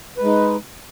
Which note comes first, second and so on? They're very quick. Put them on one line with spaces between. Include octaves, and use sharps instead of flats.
B4 G#3 D#4